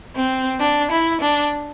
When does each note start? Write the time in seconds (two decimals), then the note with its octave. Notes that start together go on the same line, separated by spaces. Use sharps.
0.16 C4
0.61 D4
0.91 E4
1.21 D4